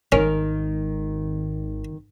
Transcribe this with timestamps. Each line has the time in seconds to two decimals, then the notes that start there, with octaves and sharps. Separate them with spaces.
0.12 G#1 D#3 C#4 A#4